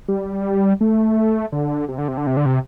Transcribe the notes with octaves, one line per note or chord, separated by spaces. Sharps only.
G3
A3
D3
C3
D3
C3
D3
C3
D3
C3